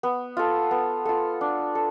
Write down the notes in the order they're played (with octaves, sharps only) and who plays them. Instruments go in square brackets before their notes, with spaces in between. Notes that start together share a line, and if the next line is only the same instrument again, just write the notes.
[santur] B3
F4 A4
B3
F4 A4
D4
A4